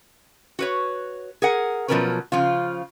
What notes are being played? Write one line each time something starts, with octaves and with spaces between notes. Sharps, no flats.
F#4 B4 C#5
G#4 A#4 F#5
B2 F3 F#3 C#4 A#4 B4
C#3 F3 F4